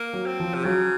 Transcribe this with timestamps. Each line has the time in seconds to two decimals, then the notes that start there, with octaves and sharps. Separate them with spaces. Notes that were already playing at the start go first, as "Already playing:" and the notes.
Already playing: A#3
0.13 F#3
0.26 C4
0.40 F3
0.55 C3
0.64 C#3 F#3